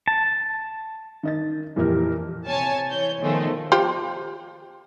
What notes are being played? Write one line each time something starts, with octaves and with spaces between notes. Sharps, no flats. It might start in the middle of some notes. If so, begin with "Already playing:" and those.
A5
D#3 D#5 A6
F2 A#2 E3 G4 A#4
C3 C#5 G#5 A5
E3 C#5 G6
B2 D#3 F3 G#3 A3
F4 G4 C5